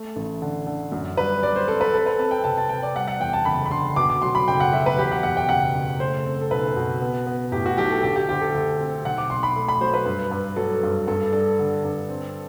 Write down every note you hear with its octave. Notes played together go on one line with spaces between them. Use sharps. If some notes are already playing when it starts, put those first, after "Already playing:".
Already playing: A3
A1
D3
D3
F#2
G3 B4
G3 D5
C5
C4 A4
B4
C4 A4
B4
C4 A5
G5
C3 A5
A5
C3 G5
D5
G3 F#5
F#5
E2 G5
A5
F#1 B5
B5
D3 C6
B2 D6
D6
F#3 C6
B5
F#1 G5
F#5
F#3 E5
B4
E2 G4
F#5
B2 F#5
G5
F#1 F#5
F#1
A3 C5
C4
A4
B1 B4
B2
B3
B3
A2 G4
F#4
B1 G4
A4
D3 G4
G4
D2 G4
A4
D2
C4
B1 F#5
D6
B1 C6
B5
A3
B5
F#3 C5
B4
G2
G2
F#3 A4
G2
G2 A4
G3 A4
D3
G2
C4